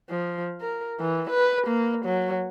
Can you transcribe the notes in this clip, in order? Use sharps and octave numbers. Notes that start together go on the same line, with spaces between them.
F3
A#4
E3
B4
A#3
F#3